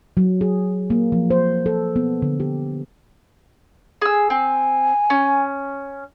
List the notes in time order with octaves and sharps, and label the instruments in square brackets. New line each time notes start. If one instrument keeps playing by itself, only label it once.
[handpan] F#3
G#4
A#3
F3
C5
A4
B3
D3
G4
[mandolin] G#4 E6
[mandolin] C4 [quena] G#5
[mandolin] C#4